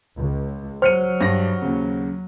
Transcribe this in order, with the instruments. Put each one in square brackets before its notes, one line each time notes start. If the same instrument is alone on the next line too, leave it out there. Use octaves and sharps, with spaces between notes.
[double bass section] C#2
[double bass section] F#3 [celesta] C5 [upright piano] F6 C#7 D#7
[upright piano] G2 A#6
D#2 C#3